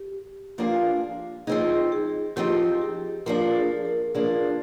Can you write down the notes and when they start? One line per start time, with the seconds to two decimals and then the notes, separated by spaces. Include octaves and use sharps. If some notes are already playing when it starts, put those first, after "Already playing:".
Already playing: G4
0.58 F3 A#3 D4 F4 G#4
1.47 F3 C4 D#4 G#4
1.92 G#4
2.36 F3 C4 D#4 G4
2.82 G#4
3.26 F3 A#3 D4 A#4
3.55 G#4
3.85 A#4
4.15 F3 A#3 D4 G#4